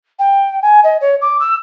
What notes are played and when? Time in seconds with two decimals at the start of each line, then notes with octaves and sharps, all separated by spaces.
0.19 G5
0.62 G#5
0.83 D#5
1.01 C#5
1.21 D6
1.40 E6